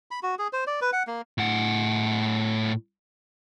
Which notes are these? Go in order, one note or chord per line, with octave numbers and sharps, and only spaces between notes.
B5
F#4
G#4
C5
D5
B4
F#5
A#3
A2 F#5